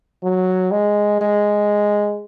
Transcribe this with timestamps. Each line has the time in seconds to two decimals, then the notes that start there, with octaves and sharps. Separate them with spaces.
0.23 F#3
0.72 G#3
1.21 G#3